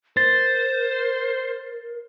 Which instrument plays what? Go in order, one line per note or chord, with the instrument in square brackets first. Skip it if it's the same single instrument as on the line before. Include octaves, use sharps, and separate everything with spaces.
[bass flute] A#4 [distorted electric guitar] C5 [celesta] A6